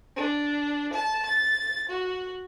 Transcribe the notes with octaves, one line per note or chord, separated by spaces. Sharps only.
D4
A5
A6
F#4